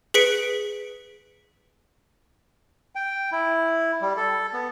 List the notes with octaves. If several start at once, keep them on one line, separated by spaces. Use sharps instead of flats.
G#4 B4 B6 C#7 D7
G5
E4
G3
A4
B3